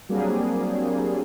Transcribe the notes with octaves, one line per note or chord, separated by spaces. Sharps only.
F#3 G3 A#3 C4 D4 G#4